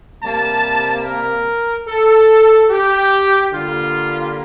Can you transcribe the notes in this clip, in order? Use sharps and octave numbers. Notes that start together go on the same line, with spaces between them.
C3 G3 A#3 A5
A#4
A4
G4
D3 G3 A#3 F4